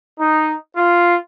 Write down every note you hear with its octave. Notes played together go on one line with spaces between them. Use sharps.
D#4
F4